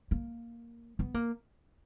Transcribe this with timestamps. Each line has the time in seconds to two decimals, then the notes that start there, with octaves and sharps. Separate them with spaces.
0.11 A#3
0.99 B3
1.14 A#3